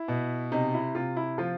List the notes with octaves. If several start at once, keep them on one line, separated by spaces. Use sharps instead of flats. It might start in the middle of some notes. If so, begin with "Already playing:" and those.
Already playing: E4
B2
C3 D#4
E4
C3 F4
E4
F3 F4